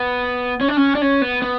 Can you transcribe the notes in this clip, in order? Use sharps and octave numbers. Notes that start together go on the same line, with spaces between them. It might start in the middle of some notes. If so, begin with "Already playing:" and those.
Already playing: B3
C#4
D4
C#4
D4
C#4
B3
B3